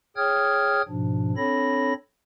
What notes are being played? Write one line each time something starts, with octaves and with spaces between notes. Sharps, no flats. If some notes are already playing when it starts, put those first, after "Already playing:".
G#4 C#5 G5 D#6 F6 G#6
G#2 B2 F3 D4
C4 D4 A4 C#5 B5 A#6